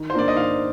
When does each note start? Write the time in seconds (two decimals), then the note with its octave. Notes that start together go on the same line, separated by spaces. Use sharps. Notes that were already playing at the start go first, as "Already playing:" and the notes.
Already playing: D#3
0.10 C5
0.14 A#3 D4 F4 D5
0.28 D#5
0.36 D#3 F5